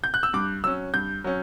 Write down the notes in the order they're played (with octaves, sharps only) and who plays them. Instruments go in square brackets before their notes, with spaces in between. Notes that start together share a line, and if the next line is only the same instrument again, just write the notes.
[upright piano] G6
F#6
E6
G2 D6
F#3 C#4 E6
G2 G6
F#3 C#4